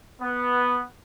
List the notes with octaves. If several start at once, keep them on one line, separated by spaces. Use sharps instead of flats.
B3